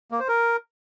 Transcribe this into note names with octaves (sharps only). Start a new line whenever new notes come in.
A#3
C5
A#4